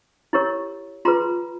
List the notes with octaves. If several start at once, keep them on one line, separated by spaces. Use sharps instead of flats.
E4 G4 A#4 C#5
F4 G#4 B4 A#5 C6